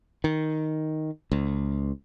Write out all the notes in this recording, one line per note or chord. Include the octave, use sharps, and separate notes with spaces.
D#3
C#2